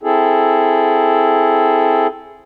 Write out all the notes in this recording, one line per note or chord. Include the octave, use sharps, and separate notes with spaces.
C4 E4 G#4 A4